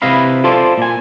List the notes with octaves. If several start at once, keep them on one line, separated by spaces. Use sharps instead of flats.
C3 E4 B4 D#5 F5 B5
E4 F4 A4 C5 D5
A#2 G#5